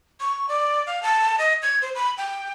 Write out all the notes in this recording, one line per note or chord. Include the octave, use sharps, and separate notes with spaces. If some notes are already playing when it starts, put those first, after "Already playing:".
C#6
D5
F5
A5
D#5
G#6
C5
B5
G5